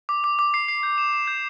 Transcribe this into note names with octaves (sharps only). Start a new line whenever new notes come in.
D6
D6
D6
C7
C7
G6
E7
E7
G6